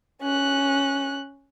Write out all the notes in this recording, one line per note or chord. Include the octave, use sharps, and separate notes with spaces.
C#4 F#6